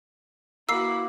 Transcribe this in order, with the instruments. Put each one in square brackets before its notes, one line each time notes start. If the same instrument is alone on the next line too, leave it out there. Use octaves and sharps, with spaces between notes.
[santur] A#3 B4 [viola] E4 F#4 [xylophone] E6 C7